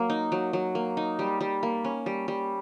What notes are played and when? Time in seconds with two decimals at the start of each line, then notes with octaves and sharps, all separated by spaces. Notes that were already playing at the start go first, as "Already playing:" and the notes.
Already playing: F#3 A#3
0.10 D#4
0.32 F#3
0.53 F#3
0.75 A#3
0.97 D#4
1.19 G3
1.41 G3
1.63 A#3
1.84 C#4
2.06 G3
2.28 G3